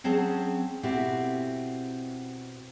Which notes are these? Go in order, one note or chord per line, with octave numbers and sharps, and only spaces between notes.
F#3 C4 C#4 G#4 A5
B2 C4 E4 F#4 G4 A4